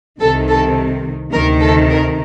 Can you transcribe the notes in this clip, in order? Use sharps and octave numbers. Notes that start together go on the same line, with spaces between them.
C2 C3 D#3 A4
A4
D2 C3 D#3 A#4
A4
A#4